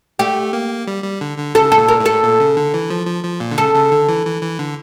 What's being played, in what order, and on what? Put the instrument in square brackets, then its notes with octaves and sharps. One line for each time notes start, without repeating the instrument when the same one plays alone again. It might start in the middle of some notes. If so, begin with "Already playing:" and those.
[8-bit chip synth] A3 [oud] G4
[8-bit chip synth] A#3
G3
G3
D3
D3
[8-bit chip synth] C#3 [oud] A4
[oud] A4
[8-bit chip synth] A#2
[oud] A#4
[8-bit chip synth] A2
[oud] A4
[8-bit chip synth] A#2
C#3
D3
E3
F3
F3
F3
A#2
D3
[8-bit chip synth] C#3 [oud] A4
[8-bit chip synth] C#3
D3
E3
E3
E3
D3